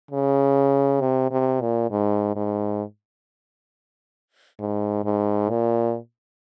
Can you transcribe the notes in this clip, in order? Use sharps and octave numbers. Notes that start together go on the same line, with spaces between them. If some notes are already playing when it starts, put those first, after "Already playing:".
C#3
C3
C3
A#2
G#2
G#2
G#2
G#2
A#2